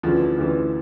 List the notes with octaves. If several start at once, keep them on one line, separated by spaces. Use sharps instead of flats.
D2 C#3 E3 F3
D2 C#3 E3